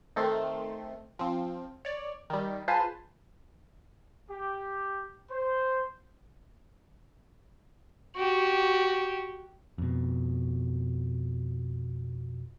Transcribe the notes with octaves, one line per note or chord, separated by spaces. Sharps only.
D#3 A3 C4 C6
F3 C4
C#5 D5
D#3 G3
F4 G#4 B4 C5 A5 C6
G4
C5
F#4 G4
F2 B2